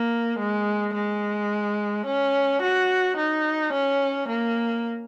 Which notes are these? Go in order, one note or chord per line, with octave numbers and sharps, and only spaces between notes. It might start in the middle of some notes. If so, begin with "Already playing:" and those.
Already playing: A#3
G#3
G#3
C#4
F#4
D#4
C#4
A#3